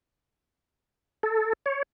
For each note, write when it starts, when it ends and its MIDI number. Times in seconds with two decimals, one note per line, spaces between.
1.23 1.53 69
1.66 1.83 73